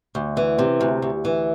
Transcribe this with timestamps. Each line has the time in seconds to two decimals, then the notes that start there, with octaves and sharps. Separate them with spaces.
0.15 D2
0.37 E3
0.59 C3
0.81 D2
1.02 D2
1.25 E3